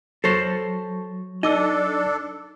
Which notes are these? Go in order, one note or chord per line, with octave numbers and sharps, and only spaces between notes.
F#3 A4 C5 C#6 A#6
D4 D#4 A4 D#5 D6 E6